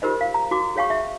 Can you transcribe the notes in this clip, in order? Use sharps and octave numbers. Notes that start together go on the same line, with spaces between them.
F4 G4 A#4 C5 D#5
F5
A#5
F#4 D6
G#4 C#5 F5 G5 C#6
E5